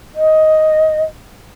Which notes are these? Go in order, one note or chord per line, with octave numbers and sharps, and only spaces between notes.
D#5